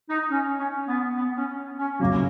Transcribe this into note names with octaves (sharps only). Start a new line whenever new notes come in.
D#4
C#4
C#4
B3
B3
C#4
C#4
F#2 C#3 F#3 A#3